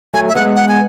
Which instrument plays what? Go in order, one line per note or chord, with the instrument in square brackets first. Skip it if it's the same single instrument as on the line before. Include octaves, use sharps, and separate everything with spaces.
[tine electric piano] F#3 A3 [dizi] G#5
[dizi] E5
[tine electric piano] G#3 B3 [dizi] F#5
[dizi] F#5
G#5